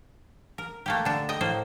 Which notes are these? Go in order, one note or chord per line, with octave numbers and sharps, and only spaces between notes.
A#4
A3 A#3 G4
D3 D4
D#5 G5
A2 A#3 C5